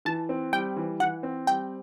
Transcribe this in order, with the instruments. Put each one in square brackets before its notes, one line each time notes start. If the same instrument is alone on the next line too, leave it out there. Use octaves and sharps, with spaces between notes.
[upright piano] E3 [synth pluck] A5
[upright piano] C4
[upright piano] G3 [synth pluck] G5
[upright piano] E3
[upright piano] E3 [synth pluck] F#5
[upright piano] C4
[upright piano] G3 [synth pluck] G5